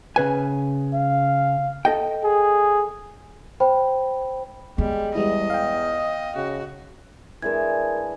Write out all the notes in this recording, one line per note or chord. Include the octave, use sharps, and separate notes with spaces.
C#3 B4 G#5
F5
A4 D#5 G5
G#4
C5 G5 B5
G3 G#3 B3
E2 G3 G#3 E4 D#5
F5 G5
C#3 F#4
E3 G#3 D4 A#4 G#6